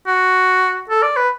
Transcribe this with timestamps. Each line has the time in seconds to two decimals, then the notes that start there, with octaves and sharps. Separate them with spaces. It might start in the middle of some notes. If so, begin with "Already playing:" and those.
0.07 F#4
0.90 A4
1.03 D5
1.17 B4